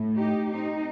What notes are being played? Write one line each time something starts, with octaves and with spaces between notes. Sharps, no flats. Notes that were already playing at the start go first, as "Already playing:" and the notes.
Already playing: A2 A3
D#4 G4
C4 D#4